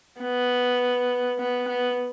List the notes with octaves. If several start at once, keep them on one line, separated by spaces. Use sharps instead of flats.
B3
B3
B3